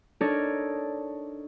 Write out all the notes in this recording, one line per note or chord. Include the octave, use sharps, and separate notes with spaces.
D4 D#4 A4 A#4 C#5 D5